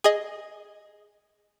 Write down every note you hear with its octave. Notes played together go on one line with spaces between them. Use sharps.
G#4 D#5